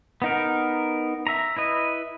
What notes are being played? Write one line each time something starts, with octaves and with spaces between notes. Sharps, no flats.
B3 D#4 A#4
E5 A#5
E4 B4 D#5